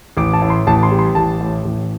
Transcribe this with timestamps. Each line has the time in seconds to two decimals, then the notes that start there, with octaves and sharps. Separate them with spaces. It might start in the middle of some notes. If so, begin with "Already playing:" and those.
0.17 A1 D6
0.33 A5
0.42 A2
0.50 C6
0.67 A1 A5
0.83 C6
0.92 G3
0.99 C6
1.15 A1 A5
1.41 A2
1.65 A1